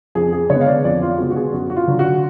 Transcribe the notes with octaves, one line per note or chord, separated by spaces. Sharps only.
F2 G#4
G#4
D3 G#3 B3 C#5
F5
D5
F2 D5
F4
D3 G#3 B3 F#4
F#4
G#4
F#2 F#4
F#4
F4
D3 F#3
F#4